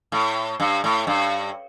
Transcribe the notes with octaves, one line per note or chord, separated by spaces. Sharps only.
A2
G2
A2
G2